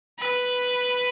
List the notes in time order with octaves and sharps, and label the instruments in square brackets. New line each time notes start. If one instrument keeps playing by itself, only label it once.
[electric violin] B4